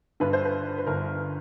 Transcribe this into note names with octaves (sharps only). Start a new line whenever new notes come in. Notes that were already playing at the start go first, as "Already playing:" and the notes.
G1 G2 D3 B4
C5
B4
B4
G1 G2 D3 A#4